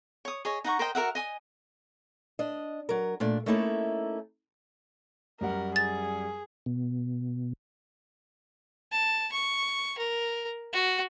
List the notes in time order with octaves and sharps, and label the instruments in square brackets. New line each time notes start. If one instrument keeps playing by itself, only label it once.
[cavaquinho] C#5 D#6
G#4 C#5 D#5
D#4 F#5 A#5 C#6
A#4 C5 D#5 G5
F#4 A#4 E5 F#5
D#5 G#5 D#6
[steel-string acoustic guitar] D4 D#5
F#3 A#4
A#2 A3 D4
A3 A#3 C#4 D#4 E4 A4
[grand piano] F#2 G3 F#5 [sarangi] A#4
[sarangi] G#4 [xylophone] A6
[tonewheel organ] B2
[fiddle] A5
C#6
A#4
F#4